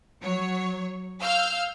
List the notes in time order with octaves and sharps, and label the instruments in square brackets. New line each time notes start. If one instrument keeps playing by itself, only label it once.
[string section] F#3 C#5
F5 E6 F6 G6